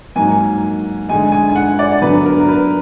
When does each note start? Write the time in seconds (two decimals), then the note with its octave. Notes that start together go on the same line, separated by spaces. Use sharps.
0.16 G#2 F#3 A#3 D#4 G#5
1.09 D3 G#3 D#4 G#5
1.32 G#5
1.49 G#5
1.56 F#5
1.79 D5
2.02 D3 F#3 B3 D4 B4
2.26 A#4
2.40 A#4
2.48 B4